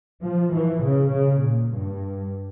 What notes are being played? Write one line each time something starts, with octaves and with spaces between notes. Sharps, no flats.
F3
E3
C#3
C#3
A#2
G2